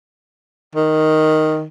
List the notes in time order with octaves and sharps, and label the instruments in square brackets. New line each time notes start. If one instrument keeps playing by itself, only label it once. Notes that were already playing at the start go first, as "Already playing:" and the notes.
[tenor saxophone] D#3